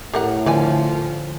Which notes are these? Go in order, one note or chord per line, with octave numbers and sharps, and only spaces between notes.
A2 G4 A#4 F#5
D3 F3 A#4 D5 G#5